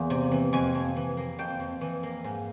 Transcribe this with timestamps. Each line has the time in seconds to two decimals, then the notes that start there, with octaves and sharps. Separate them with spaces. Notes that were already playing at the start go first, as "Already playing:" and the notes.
Already playing: E2 A#3
0.10 C3
0.32 E3
0.53 F2 G#5
0.75 F2
0.96 E3
1.17 A#3
1.39 F2 G5
1.60 F2
1.81 E3
2.03 A#3
2.24 G#2